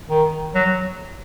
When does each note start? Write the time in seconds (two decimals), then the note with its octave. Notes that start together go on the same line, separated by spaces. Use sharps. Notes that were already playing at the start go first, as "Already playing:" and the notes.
0.09 D#3
0.55 F#3